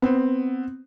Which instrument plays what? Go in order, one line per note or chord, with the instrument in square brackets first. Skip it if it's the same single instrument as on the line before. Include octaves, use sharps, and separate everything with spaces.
[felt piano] B3 C4